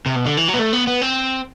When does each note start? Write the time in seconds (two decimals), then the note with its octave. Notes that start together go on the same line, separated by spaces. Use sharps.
0.06 C3
0.16 B2
0.26 D3
0.37 E3
0.48 F#3
0.54 B3
0.59 A3
0.73 B3
0.87 B3
1.02 C4